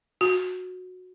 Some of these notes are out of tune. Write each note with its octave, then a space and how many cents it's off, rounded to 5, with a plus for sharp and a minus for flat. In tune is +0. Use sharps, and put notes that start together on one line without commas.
F#4 -15